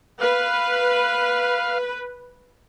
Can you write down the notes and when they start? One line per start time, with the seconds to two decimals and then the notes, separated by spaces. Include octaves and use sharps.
0.21 B4 F5